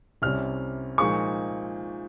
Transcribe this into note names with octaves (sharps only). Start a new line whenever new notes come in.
C2 C3 G3 C#4 F6
A#2 F3 G#3 D#4 G#4 C#6